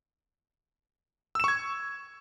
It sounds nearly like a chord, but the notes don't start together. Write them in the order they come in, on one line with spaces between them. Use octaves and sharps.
E6 E7 C#6 G#6